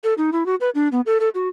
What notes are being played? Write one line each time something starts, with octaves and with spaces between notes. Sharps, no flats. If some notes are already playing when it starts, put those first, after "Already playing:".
A4
D#4
E4
F#4
B4
D4
B3
A4
A4
F#4